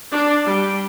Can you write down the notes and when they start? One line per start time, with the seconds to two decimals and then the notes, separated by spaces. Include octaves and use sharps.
0.11 D4
0.46 G3